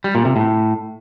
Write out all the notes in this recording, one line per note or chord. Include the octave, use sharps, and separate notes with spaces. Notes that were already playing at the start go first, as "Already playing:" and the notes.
G3
A#2
C3
A2